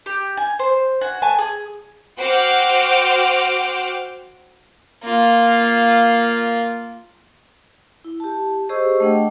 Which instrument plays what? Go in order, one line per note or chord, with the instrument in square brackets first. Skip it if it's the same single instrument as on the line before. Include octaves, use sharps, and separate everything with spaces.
[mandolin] G4
G#5
C5
F#4 G#5
A3 G#5 A5
G#4
[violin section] F#4 C5 F#5 G5 D6 F6
[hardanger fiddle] A#3 F4
[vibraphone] E4
G4 A5
G4 G#4 C5 D#5 C#6 E6
A3 D4 D#5 F#5 G5